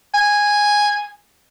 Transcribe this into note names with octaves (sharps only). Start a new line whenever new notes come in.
G#5